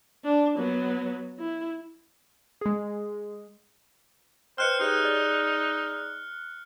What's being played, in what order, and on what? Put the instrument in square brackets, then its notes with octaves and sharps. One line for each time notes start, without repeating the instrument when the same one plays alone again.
[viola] D4
F#3 B3
E4
[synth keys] G#3 G#4
[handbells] B4 D#5 G5 [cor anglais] C5 [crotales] F6 F#6 C#7
[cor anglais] D#4 [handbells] G4 G#4 C#5
[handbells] G#4 D5